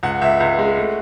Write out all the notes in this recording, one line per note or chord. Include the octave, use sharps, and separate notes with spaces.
C#2 F#5
C#2 E5
C#2
G#3
A3